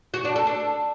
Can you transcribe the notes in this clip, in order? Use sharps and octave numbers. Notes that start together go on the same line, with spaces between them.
F#4
D4
A4
D4